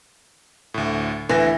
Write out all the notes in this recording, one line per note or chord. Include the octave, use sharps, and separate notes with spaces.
D2 A2
D2 E3 B4 A#6